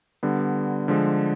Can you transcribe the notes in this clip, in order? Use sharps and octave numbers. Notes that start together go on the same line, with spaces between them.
D3 G3 B3
D3 F3 G#3